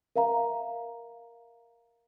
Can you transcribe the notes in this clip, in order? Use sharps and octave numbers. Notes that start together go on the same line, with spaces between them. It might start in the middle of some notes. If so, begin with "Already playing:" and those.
A#4 E5 F5 A#5